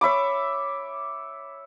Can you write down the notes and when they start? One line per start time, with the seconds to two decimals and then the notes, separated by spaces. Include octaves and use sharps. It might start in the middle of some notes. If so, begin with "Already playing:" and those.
0.01 C#5 E5 B5 D6